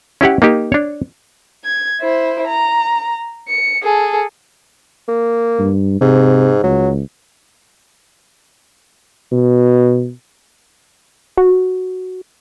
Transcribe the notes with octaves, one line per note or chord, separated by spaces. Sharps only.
C#4 E4 G4 F#5
A#3 D#4 G4
D4 C#5
G#6
E4 C5
A#5
C#7
G#4 A4
A#3
G2
G#2 C3
C#2 F#3
B2
F#4